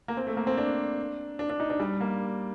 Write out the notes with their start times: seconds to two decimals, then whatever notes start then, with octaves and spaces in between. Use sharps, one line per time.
0.08 A#3
0.17 C4
0.27 A3
0.37 A#3
0.47 C4
0.58 D4
1.39 D4
1.50 D4
1.60 D#4
1.70 D4
1.80 G3
2.01 A#3